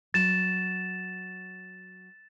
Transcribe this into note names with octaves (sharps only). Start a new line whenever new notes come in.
F#3 A6 E7